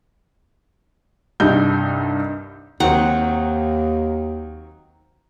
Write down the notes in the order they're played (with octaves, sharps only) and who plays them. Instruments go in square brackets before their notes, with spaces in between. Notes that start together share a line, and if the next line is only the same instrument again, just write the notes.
[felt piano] C2 G2 D#4 G6
[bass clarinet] D#2 [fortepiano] D#3 F#3 C4 [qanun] F#5